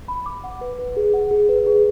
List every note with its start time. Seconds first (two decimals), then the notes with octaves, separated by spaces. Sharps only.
0.08 B5
0.26 D6
0.44 F#5
0.61 B4
0.79 B4
0.97 G#4
1.14 F#5
1.31 G#4
1.49 B4
1.67 G#4